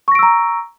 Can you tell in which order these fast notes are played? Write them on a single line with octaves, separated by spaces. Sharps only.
C#6 A#6 D7 E6 A#5